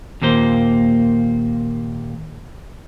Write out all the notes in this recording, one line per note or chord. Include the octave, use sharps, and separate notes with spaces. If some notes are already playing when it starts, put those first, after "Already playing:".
D#2 A#2 A#3 C5